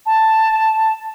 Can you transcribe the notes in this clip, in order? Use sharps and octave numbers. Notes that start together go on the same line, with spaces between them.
A5